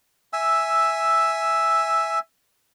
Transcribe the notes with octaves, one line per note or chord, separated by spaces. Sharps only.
E5 G#5 E6